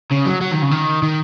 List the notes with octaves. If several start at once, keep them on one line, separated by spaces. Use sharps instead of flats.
C#3
F#3
F#3
D#3
C#3
D#3
D#3